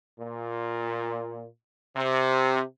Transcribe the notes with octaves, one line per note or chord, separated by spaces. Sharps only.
A#2
C3